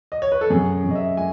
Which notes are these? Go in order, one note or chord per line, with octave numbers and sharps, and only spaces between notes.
D#5
C#5
B4
A4
F#2 G#4
F#2
D#5
E5
G#3 G#5